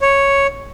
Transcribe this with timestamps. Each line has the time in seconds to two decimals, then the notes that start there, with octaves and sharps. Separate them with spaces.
0.01 C#5